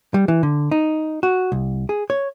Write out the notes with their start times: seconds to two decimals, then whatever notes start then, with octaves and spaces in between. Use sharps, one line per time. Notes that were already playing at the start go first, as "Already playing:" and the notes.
0.14 G3
0.28 E3
0.43 D3
0.71 D#4
1.23 F#4
1.52 C2
1.89 G#4
2.10 C#5